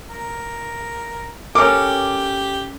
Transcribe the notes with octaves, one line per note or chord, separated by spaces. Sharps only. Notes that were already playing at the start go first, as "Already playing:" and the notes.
A#4
C#4 G4 A4 A#4 D6